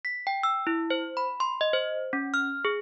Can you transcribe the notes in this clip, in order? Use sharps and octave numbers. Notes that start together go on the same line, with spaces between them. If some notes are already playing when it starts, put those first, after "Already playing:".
B6
G5
E6
E4
C5
B5
C6
D#5
C5
C#4
F6
G#4